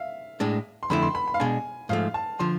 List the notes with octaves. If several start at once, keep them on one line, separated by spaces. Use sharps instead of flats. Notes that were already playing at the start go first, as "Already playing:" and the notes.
Already playing: E5 F5
A2 G#3 D4
C6
F2 D3 A3 E4 B5
C6
B5
B5
F5
B2 G#3 D4 G#5
G#2 F3 A3 F5
A5
D3 F3 C6